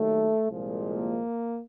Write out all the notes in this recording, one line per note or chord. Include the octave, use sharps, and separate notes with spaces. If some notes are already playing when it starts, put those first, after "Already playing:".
Already playing: D#2 D#3 F#3 A3
C2 A#2 F3 G#3
A#3